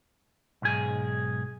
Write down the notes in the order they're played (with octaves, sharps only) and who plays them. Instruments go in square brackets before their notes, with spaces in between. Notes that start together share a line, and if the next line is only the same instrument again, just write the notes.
[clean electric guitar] B1 G#2 G#4